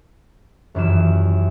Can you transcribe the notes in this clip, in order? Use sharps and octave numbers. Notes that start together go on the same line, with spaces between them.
D#1 F#2 E3 E7